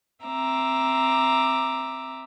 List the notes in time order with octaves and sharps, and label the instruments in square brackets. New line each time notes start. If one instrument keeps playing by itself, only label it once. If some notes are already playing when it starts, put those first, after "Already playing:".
[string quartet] C4 E5 A#5 D6